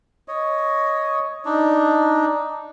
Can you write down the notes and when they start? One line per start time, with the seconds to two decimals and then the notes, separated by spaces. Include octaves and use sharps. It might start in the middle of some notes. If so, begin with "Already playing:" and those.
0.28 C#5 D#5
1.45 D4 D#4